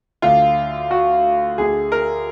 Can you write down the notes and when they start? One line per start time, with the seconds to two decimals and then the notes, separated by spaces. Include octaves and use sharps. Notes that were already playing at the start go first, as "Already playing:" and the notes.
0.22 D2 D3 F4
0.91 F#4
1.58 D2 D3 G#4
1.92 A#4